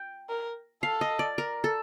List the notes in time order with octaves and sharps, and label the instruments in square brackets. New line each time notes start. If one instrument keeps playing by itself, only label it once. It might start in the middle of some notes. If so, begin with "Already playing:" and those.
Already playing: [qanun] G5
[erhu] A#4
[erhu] A4 [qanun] F5
[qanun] D#5
D5
A#4
A4